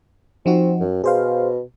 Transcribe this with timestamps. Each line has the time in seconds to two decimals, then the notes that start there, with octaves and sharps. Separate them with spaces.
0.46 F3 C4 D#4 F#4
0.80 F#2
1.04 B2 G#4 C5 F5